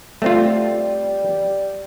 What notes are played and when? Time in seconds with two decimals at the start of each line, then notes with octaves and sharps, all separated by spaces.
0.22 G3 A3 C4 F4